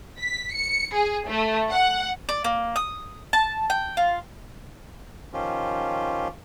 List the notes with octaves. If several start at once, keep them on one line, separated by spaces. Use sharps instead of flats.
B6
C#7
G#4
A3
F#5
D5
A#3
D#6
A5
G5
F4
D#3 F3 C#4 F4 G4